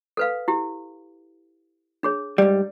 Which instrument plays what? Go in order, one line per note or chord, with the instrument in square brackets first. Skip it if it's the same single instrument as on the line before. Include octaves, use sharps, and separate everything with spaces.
[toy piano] A4 B4 F5
E4 G4
D4 G#4 C#5
[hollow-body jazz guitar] G#2 G3 [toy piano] D5